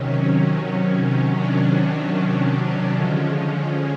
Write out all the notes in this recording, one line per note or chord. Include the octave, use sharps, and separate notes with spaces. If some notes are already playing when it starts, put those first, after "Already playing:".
Already playing: C3 D#3 F#3 C#4
C#4
D4
D4
C#4
D3 F3 G#3